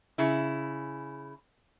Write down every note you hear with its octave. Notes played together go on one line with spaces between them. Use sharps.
C#3 E4